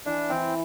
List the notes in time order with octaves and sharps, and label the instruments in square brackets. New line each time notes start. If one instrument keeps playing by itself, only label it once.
[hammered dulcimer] E3 [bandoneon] D4
[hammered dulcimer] E3 [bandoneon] C4